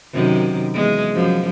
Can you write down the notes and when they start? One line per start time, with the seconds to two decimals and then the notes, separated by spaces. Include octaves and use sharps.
0.13 F#2 C3 D#3
0.74 E2 G#3
1.14 F#2 F3